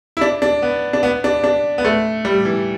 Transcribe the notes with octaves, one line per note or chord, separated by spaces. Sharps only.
E4
D4
D4
B3
D4
B3
D4
D4
B3
A3
G3
E3